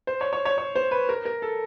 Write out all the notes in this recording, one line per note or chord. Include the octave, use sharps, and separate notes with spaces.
C5
C#5
C#5
C#5
C#5
C5
B4
A#4
A#4
A4